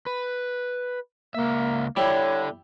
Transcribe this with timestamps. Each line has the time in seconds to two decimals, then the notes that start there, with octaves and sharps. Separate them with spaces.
0.06 B4
1.35 C#2 A#3 E5
1.96 G3 E4 A4 C#5 D5